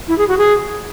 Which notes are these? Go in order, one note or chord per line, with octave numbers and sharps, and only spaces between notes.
E4
G#4
F#4
G#4